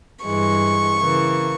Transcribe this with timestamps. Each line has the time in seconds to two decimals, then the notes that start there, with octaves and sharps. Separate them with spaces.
0.24 G2 E3 G#3 C#6
1.00 C#3 E3 A#3